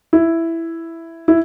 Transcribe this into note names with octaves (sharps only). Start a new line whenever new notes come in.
E4
E4